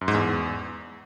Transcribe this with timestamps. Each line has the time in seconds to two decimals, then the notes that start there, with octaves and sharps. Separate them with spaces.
0.01 F#2
0.08 G#2
0.14 E2